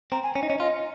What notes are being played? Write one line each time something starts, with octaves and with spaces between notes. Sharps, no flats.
C4 A#5
G#5
C#4
D#4
C#4 D#5
F4 D#5